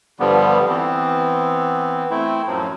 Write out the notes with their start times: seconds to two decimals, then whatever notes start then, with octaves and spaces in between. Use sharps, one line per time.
0.20 G2 D3 F3 G3 B3
0.68 E3 B3 C4
2.10 A3 C4 E4
2.47 F#2 A2 F3 F#3